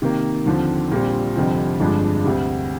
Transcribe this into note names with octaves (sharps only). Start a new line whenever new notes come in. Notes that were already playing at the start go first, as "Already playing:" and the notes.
C3 D#3 A#3
D#2 D3 F3 C4
A#1 A#2 G3 C4
F1 F2 D3 G3 C4
G1 G2 F3 G#3 D4
D2 C3 G3